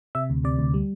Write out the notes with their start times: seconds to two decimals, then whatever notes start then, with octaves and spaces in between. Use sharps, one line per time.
0.15 C3 E5
0.30 D2
0.44 C3 D5
0.59 D2
0.74 G3